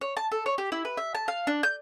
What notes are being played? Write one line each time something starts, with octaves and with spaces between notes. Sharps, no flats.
C#5
A5
A4
C#5
G4
E4
B4
E5
A5
F5
D4
G6